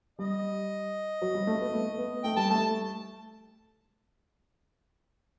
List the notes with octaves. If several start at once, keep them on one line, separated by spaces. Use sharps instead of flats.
G3 D#5
F#3
G3
A3
B3
A3
B3
A3 G5
G3 A5
A3 A5